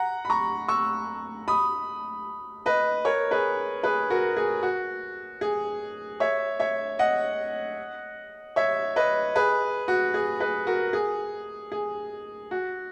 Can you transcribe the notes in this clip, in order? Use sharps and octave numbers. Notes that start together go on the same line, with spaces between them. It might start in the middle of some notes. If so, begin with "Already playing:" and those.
Already playing: F#5 A#5
B5
A#5 C#6
C#6 E6
B5 D#6
B4 D#5
A#4 C#5
G#4 B4
G#4 B4
F#4 A#4
G#4
F#4
G#4
C#5 E5
C#5 E5
D#5 F#5
C#5 E5
B4 D#5
G#4 B4
F#4
G#4
G#4 B4
F#4 A#4
G#4
G#4
F#4